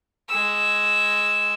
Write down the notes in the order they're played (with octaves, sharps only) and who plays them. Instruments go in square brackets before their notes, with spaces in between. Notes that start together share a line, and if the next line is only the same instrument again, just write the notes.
[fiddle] G#3 E6